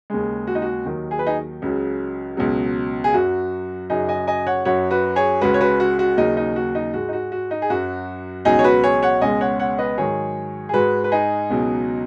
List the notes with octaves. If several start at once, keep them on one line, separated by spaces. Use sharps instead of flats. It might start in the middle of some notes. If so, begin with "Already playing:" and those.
D#2 C#3 G#3
F#4
D#4
F#4
D#2 D#3 F#3
G#4
B4
D#4 G#4
C#2 C#3 F#3
C#2 B2 F#3
G#4
F#2 F#3 F#4
F#2 C#3 F#3 D#4 G#4
D#5 G#5
D#5 G#5
C#5 F#5
F#2 F#3 C#5 F#5
F#4 B4
G#4 C#5
C#2 C#3 G#3 F#4 B4
C#5
F#4 B4
F#4
F#4
D#2 C#3 F#3 D#4
D#4
F#4
D#4
G#2 G#3 F#4
D#4
F#4
F#4
D#4
G#4
F#2 F#3 F#4
C#2 B2 F#3 D#4 G#4
C#5
F#4 B4
G#4 C#5
C#5 F#5
C#2 B2 G#3 D#5 G#5
C#5 F#5
C#5 F#5
B4 D#5
G#2 D#3 F#3 G#4 C#5
G#4
G#2 G#3 F#4 B4
B4
D#4 G#4
C#2 B2 F#3